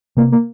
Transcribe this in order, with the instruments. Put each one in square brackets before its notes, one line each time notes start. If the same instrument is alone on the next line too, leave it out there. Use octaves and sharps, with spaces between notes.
[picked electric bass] C3 [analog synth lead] A#3
[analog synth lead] A#3